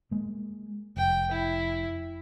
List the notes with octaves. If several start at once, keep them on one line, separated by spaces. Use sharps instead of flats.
G#3 A#3
F1 G5
E4